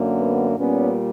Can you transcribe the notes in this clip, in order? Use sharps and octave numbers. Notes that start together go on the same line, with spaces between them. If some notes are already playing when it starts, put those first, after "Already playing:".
Already playing: F#2 D3 A#3
B3
A#2 G3 B3 C#4